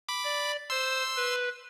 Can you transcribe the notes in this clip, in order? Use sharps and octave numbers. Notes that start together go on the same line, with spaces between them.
B5 D6
D5
C5 C6 E6
B4